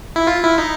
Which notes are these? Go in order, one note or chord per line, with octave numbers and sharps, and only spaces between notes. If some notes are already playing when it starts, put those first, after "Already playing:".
E4
F4
E4
D#4